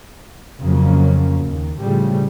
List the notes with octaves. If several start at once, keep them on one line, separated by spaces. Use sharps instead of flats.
F2 C#3 F#3 A#3 C#4
D#2
A2 C#3 F3 G3 A3